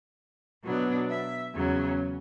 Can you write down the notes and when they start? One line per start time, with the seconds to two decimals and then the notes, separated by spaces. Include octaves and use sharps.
0.63 B2 F#3 B3 D4
1.09 E5
1.54 E2 C#3 F#3 C#4